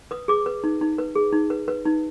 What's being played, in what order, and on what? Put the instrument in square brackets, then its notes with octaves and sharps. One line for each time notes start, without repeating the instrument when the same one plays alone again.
[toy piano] B4 D#6
G#4 D6
B4
D#4
D#4
B4
G#4
D#4
B4
B4
D#4